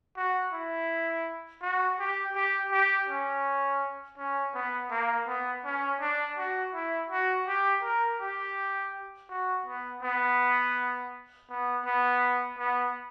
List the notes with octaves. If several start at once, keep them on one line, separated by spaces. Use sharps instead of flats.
F#4
E4
F#4
G4
G4
G4
C#4
C#4
B3
A#3
B3
C#4
D4
F#4
E4
F#4
G4
A#4
G4
F#4
B3
B3
B3
B3
B3